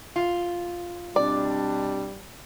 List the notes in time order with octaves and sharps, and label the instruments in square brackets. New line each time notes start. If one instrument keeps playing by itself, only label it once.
[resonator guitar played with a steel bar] F4
[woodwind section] B2 C4 D4 [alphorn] G3 [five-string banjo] D5